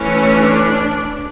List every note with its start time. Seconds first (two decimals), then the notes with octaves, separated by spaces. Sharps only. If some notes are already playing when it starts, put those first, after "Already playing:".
Already playing: E3 A3 C#4
0.36 D4